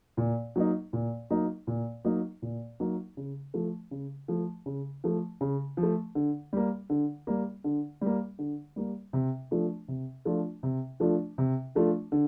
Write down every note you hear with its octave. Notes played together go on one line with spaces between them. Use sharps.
A#2
F#3 A#3 D#4
A#2
F#3 A#3 D#4
A#2
F#3 A#3 D#4
A#2
F#3 A#3 D#4
C#3
F3 A3
C#3
F3 A3
C#3
F3 A3
C#3
F3
A3
D3
G3 A#3
D3
G3 A#3
D3
G3 A#3
D3
G3 A#3
C3
F3 A3 D4 F4
C3
F3 A3 D4 F4
C3
F3 A3 D4 F4
C3
F3 A3 D4 F4
D3